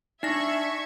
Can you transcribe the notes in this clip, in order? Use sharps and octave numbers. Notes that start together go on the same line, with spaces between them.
D4 D#4 E5 C#6 G#6 A#6